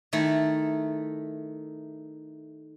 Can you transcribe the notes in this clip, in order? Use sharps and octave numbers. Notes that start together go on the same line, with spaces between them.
D#3 A3 E4 A4